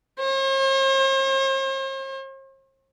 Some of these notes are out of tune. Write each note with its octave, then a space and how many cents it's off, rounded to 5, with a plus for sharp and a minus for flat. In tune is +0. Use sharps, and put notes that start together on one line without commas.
C5 +45